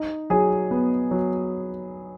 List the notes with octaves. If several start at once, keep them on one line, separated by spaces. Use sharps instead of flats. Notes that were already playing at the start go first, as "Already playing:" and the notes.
Already playing: D#4
F#3 G#4 G#5
B3
F#3